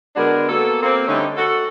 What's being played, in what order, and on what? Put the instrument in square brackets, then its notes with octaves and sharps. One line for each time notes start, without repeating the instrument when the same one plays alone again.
[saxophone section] D3 G#3 B3 D4 F#4 A#4
A#3 B3 F#4 A4
A#3 C4
D3 G3 A3 C#4 D#4
F#4 A4